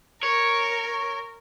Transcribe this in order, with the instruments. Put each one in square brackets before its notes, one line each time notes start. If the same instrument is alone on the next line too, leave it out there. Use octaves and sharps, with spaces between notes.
[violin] A#4 [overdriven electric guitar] C#5